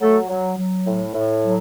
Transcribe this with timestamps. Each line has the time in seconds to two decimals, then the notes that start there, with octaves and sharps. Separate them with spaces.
0.01 F#3 A3 A4
0.29 F#3
0.57 F#3
0.87 A2
1.14 A2
1.43 F#3